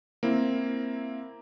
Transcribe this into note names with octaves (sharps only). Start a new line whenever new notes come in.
A#3 C4 E4